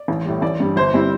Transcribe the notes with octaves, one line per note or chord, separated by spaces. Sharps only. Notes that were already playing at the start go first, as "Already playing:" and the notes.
Already playing: D5
A1
A2 G3
A1 D5
G2 G3
G1 C5
G3 C4 E4